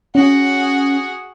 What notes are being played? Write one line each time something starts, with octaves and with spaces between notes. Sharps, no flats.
C#4 F#4 G#4